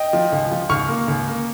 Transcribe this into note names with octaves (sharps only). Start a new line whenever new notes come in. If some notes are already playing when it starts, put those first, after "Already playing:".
Already playing: D#5 G5
F3
C#2
F3
C#2 C#6 F6
A#3
C#2
A#3